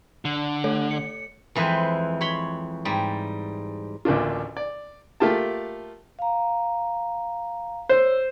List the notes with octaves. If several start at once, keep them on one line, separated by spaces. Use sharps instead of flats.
D3
A3 A4 C#5
C#7
F2 E3 G#3 B4 C5
C#5 B5 C6
G#2 G3
A1 D2 A#3 D4 F4
D5
A3 A#3 F4 G4 A5
F5 A#5
C5 C#5 E6